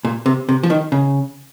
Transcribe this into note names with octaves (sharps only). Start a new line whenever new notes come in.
A#2
C3
C3
F3
D#3
C#3